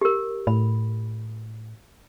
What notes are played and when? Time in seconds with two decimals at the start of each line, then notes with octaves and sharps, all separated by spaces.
0.01 G4 A#4
0.47 A2 B5